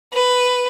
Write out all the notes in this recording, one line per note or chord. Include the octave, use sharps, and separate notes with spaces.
B4